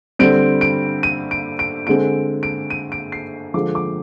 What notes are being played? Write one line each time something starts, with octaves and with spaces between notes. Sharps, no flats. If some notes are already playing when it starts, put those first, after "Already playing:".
D3 G3 C4 D7
D7
D#7
D7
D7
D3 G#3 C4 D7
D7
D#7
D7
C7
D3 F3 G#3 D6
D6